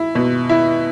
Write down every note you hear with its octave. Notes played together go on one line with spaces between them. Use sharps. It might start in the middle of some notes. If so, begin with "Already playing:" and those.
Already playing: E4
B2
E4